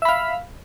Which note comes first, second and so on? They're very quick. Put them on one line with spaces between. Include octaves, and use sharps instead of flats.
E5 B5 F5